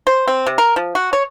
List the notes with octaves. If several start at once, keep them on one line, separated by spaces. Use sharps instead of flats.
C5
C4
C3
A#4
F3
F#4
C#5